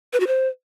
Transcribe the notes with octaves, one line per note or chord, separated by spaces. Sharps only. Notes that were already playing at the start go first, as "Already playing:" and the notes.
B4
F#4
C5